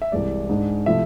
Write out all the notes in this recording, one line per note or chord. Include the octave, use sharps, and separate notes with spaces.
E5
C2 C3 E3 G#3 D5
G#2 G#3 D4
C3 F3 A3 E4 E5